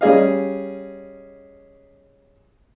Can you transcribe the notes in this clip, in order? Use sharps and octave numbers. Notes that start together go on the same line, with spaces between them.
G3 C#4 G#4 D#5 F5